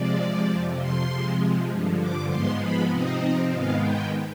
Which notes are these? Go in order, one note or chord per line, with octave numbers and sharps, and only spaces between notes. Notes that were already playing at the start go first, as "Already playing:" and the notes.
Already playing: C3 F3 G#3 D5
F2 C3 F3
C6
C3 F3 G#3
G2 D3 F3
D6
G#2 F3 G#3 B3 C6
B5
C3 F3 C4 D#4 D#5
G#2 D#3 G#3 B3 F5
G5